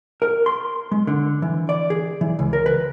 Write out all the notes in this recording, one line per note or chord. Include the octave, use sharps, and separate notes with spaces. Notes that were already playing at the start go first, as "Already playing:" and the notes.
A#4
C6
G#3
D3
E3
D5
G#4
E3
C#2
A#4
B4